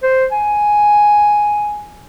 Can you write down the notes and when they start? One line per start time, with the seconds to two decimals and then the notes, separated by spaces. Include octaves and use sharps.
0.03 C5
0.32 G#5